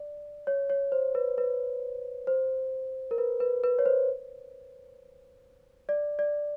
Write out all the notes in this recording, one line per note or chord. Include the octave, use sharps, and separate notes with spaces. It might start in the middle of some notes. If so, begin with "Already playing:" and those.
Already playing: D5
C#5
C#5
C5
B4
B4
C5
A#4
B4
B4
B4
C#5
C5
D5
D5